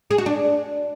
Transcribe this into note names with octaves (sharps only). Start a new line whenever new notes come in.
G#4
F#4
D4